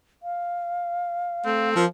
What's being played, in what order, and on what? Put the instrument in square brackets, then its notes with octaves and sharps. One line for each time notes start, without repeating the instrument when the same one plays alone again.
[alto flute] F5
[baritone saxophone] A3 [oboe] C4
[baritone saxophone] F3 [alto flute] A#4